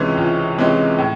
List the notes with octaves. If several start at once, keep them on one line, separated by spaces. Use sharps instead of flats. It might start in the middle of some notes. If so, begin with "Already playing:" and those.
Already playing: C#2 C3 E3 G#3 C#4
C#2
C3 E3 G#3 C#4
A2